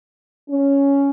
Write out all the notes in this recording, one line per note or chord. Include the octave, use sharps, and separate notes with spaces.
C#4